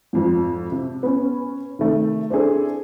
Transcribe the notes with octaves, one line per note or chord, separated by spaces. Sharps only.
G#1 F2 F3
C3
B3 C#4
C3 D#3 A3
C4 D4 E4 G#4 A4